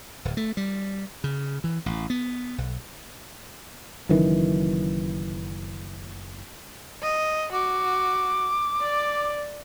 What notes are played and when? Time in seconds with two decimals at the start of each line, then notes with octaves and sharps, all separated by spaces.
0.25 D1
0.37 A3
0.57 G3
1.24 C#3
1.64 E3
1.86 A1
2.10 B3
2.58 B1
4.09 F#1 F#2 D#3 E3
7.03 D#5
7.52 F#4 D6
8.82 D5